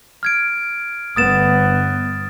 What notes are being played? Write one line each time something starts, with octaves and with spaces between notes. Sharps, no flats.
F6 G#6 D7
G1 B3 D#6 A6 E7